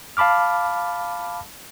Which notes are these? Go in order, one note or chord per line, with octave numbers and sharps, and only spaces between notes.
F5 A5 B5 D6 F6